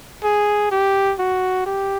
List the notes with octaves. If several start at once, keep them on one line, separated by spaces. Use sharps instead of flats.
G#4
G4
F#4
G4